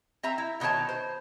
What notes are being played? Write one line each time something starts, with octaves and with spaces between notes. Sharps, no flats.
C4 E5 A#5
E4
B2 D#3 D#4 C#5 A5
C5